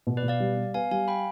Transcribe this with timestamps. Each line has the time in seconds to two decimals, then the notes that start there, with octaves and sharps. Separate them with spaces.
0.07 B2
0.17 B4 D5
0.23 B2
0.28 D5 F5
0.40 G3
0.57 G3
0.74 B3 F5 G#5
0.91 G3 F5 G#5
1.08 G5 B5